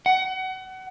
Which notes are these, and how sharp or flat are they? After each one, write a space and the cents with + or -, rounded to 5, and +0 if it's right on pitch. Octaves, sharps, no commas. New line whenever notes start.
F#5 +30